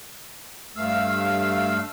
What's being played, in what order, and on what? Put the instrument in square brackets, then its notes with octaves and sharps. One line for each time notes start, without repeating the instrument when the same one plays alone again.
[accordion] G2 A3 F5 E6